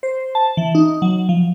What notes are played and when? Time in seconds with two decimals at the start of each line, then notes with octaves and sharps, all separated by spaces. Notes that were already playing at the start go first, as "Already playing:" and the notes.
0.03 C5
0.35 A5
0.57 E3
0.75 D#4
1.02 F#3
1.29 F3